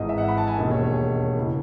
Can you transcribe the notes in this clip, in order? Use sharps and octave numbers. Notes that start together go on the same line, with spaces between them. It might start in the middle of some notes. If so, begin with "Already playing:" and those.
Already playing: G#1 G#2 E3 D#5
E5
F#5
B5
A5
G#5
E1 D#2 D#3 D#5
C#5
C#5
C#3 E3